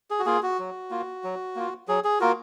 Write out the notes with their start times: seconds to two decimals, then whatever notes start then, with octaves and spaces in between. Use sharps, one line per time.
0.10 G#4
0.19 F#4
0.26 A#3 F4 G#4
0.43 F#4
0.59 F#3
0.91 A#3 F4
1.24 F#3
1.56 A#3 F4
1.88 F#3 G#4
2.04 G#4
2.20 A#3 F4 F#4 A#4